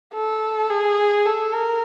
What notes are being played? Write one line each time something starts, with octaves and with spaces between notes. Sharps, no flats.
A4
G#4
A4
A#4